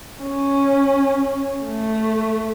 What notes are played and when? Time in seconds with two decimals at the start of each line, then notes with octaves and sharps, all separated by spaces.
0.22 C#4
1.65 A3